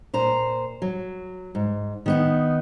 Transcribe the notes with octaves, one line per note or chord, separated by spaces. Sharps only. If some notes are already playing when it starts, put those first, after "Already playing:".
A#2 C5 A#5
F#3
G#2
D#3 B3 D#4